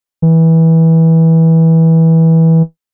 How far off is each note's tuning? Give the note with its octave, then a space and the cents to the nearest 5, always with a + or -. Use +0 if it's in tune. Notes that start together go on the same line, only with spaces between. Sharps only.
E3 -20